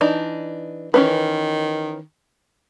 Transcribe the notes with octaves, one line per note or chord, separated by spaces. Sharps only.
E3 D4 D#4
D#3 E3 C#4 B4